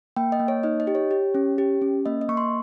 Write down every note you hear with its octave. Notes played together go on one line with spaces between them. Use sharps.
A#3 G5
D#5
A#3
C#5
D#4 D#5
D#5
G4
C#5
G4
C#4
G4
C#4
A#3 D#5
D#5
A#3 C#6
C6